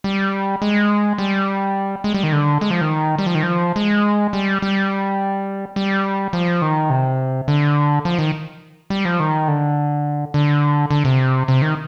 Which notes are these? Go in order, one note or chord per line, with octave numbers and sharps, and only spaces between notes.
G3
G#3
G3
G#3
G3
D#3
D3
G#3
F3
D#3
G3
F3
D#3
F3
G#3
G3
G3
G3
F3
D#3
C3
D3
F3
D#3
G3
F3
D#3
D3
D3
D3
C3
C3
D#3